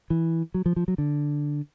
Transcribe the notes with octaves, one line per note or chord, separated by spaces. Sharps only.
E3
F#3
F3
F3
F#3
D3